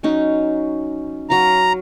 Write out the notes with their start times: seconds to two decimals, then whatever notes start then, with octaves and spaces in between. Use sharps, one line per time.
0.03 F#3 C#4 D#4
1.30 F#3 F5 A#5